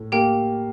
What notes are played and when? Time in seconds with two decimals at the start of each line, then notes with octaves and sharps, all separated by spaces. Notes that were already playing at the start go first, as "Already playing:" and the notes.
Already playing: A2
0.12 A#3 G4 G5